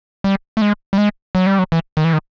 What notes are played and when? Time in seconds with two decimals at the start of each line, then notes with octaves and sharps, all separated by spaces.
0.24 G3
0.57 A3
0.62 G#3
0.93 G3
0.98 G#3
1.35 F#3
1.46 G3
1.59 F#3
1.72 E3
1.97 D#3
2.04 E3
2.13 D#3